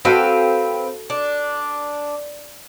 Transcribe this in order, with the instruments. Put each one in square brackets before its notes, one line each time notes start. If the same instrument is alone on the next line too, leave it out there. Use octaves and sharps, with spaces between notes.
[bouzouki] C4 B4 F5 [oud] F#4 A4
[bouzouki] D4